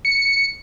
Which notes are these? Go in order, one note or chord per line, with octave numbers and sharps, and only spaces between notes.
C#7